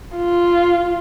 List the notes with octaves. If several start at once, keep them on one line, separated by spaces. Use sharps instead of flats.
F4